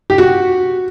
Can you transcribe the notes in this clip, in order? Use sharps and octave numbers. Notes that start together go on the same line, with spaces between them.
G4
F#4